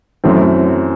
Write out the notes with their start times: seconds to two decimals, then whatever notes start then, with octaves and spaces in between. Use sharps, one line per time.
0.24 F#2 E3 A3 C4